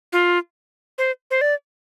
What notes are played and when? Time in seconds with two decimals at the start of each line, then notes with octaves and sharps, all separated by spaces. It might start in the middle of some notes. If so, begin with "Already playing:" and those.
0.12 F4
0.98 C5
1.31 C5
1.41 D5